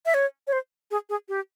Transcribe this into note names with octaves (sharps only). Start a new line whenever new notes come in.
E5
C#5
C#5
C5
G#4
G#4
G4